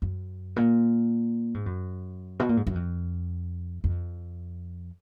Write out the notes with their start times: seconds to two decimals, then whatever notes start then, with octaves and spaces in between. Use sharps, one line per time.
0.02 F#2
0.56 A#2
1.54 G#2
1.66 F#2
2.40 B2
2.49 A#2
2.57 G#2
2.67 F#2
2.75 F2
3.84 F2